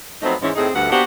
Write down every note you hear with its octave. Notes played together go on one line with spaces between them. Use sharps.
F3 F#3 A3 B3 C4 D#4
G#2 E3 G#3 C4 C#4
A2 C4 D#4 G#4
D2 G2 F#5
A#3 B3 D4 F#4 G4 C5